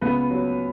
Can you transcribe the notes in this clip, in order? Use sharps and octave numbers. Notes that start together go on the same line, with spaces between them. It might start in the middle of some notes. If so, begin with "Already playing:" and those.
C#2 B3 B4
F#3